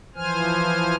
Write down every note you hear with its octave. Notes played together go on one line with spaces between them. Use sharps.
E3 F3 C5 G#5 F6